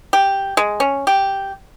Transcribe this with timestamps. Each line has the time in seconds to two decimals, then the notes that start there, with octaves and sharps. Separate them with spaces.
0.13 G4
0.57 G#3
0.80 C#4
1.07 G4